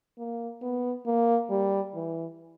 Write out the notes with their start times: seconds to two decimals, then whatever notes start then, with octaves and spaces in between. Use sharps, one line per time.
0.18 A#3
0.62 B3
1.06 A#3
1.50 G3
1.94 E3